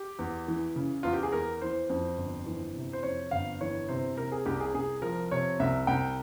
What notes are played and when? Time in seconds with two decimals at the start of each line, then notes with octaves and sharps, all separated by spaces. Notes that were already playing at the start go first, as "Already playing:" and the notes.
Already playing: G4
0.19 E2
0.48 E3
0.76 C#3
1.03 E2 F4
1.13 G4
1.23 G#4
1.32 E2 A#4
1.62 E3 C5
1.90 F2
2.18 G1
2.46 E3
2.75 C3
2.93 C5
3.03 F2 C#5
3.31 G1 F5
3.61 E3 C#5
3.89 C3 C5
4.17 C3 A#4
4.32 G#4
4.46 C2 G4
4.60 G#4
4.74 C2 G#4
5.02 F3 A#4
5.31 C3 C#5
5.60 C2 E5
5.87 C2 G5